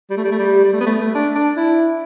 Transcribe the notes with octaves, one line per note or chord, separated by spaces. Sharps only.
G3
A3
G3
A3
G3
G3
A3
B3
A3
A3
D4
D4
E4